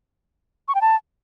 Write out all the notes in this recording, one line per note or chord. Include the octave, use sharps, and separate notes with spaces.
C#6
G5
A5